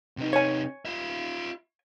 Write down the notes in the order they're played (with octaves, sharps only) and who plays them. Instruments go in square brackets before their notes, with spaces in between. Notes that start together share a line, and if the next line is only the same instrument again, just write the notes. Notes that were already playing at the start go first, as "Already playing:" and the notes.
[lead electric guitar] C3 D#4
[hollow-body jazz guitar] C#5 G#5
[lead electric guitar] F4 E5